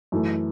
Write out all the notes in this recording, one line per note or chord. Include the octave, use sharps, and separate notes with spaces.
F#2 E3 A3